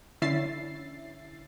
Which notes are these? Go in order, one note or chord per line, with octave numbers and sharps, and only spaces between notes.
D3 C#4 E4 E5 A6 C7